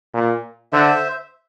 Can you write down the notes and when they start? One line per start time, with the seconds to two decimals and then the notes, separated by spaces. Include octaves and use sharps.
0.14 A#2
0.72 D3 C5 E5